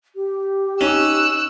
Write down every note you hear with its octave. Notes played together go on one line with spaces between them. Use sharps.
G4
C#4 D#4 E6 F#6